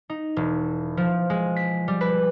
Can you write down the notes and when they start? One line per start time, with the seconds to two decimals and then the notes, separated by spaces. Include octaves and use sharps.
0.09 D#4
0.36 E1
0.97 F3
1.30 G#3
1.56 B6
1.88 G3
2.01 B4